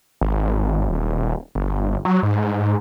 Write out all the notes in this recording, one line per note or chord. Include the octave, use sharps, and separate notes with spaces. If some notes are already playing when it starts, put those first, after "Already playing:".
G#1
D#1
G1
F#3
G#2